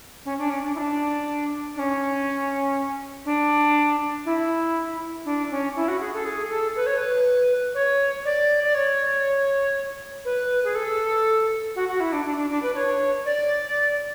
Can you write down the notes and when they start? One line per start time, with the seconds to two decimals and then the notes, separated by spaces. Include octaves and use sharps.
0.25 C#4
0.38 D4
0.49 C#4
0.62 D4
0.74 E4
0.78 D4
1.75 D4
1.79 C#4
3.25 D4
4.25 E4
5.25 D4
5.50 C#4
5.75 E4
5.87 F#4
6.00 G#4
6.13 A4
6.25 G#4
6.50 A4
6.75 B4
6.86 C#5
6.97 B4
7.74 C#5
8.25 D5
8.63 D5
8.74 C#5
10.25 B4
10.64 G#4
10.75 A4
11.75 F#4
11.88 F#4
12.00 E4
12.12 D4
12.25 D4
12.37 D4
12.50 D4
12.62 B4
12.75 C#5
13.25 D5